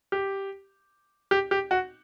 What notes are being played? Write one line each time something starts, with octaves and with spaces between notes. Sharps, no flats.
G4
G4
G4
F#4